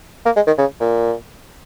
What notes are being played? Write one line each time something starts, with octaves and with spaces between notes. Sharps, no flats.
A#3
G#3
D#3
C#3
A#2